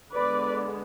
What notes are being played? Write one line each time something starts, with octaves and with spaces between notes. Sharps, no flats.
D3 G#3 B3 B4 D5